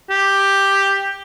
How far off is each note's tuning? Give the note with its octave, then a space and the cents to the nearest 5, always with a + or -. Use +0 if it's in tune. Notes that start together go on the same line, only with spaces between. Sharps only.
G4 +5